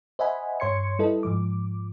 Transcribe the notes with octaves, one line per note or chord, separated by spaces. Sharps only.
C5 D#5 E5 F#5 G#5 B5
G2 C#5 C6 G#6 C#7
G3 E4 A4 B4 D#5
G#2 F3 D6